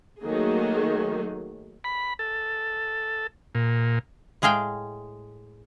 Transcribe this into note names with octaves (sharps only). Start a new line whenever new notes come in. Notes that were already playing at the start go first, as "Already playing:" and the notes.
D#3 F#3 A3 A#3 G#4
B5
A4
A#2
A2 G#3 G#4 F5 G5